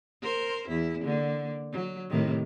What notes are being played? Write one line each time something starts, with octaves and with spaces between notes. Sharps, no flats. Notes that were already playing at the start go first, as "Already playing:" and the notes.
A#4 C5
E2 E4
D3 A#3
F#3
A2 C3 D#3